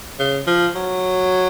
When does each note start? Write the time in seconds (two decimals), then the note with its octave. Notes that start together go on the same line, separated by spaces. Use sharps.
0.19 C#3
0.47 F3
0.75 F#3